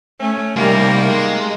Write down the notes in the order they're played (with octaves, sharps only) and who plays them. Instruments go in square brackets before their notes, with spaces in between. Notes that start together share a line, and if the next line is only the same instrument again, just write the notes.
[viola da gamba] A3 [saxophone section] C#4
[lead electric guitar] C2 [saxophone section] D#3 A#3 [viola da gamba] G3 A#4
[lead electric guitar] G#3